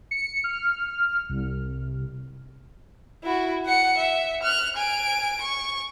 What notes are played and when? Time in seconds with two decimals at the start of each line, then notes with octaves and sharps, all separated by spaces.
0.11 C#7
0.44 F6
1.29 C2
3.23 E4 F#4
3.65 F#5 C#7
3.97 E5
4.43 F6 F#6
4.77 G#5 D7
5.41 C#6